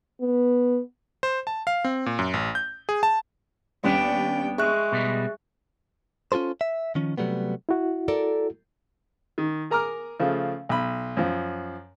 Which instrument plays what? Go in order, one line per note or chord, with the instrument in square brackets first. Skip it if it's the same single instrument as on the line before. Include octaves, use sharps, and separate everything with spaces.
[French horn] B3
[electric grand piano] C5
A5
F5
C4
A#2
F#2
A1
G6
G#4
A5
[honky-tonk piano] D#2 G3 C#4 [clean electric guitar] B3 D4 [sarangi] G5
[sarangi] G#3 [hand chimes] G#4 E5 F#6 [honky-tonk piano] C#6
[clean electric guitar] B2 G3
C#4 F4 G#4 A4 C5
E5
D#3 F3 C#4
C3 F#3 G3 A3 B3
[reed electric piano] E4 F#4
[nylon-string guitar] A4 A#4 D5
[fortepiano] D#3
G#4 A#4 A#5 D6 F6
C#3 F3 A3
B1 B5
F#2 F3